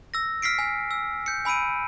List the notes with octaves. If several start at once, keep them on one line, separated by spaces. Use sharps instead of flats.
E6 A#6
F6 B6 C7 D7
G#5
E6
G6 C#7
G#5 B5 E6 D7 D#7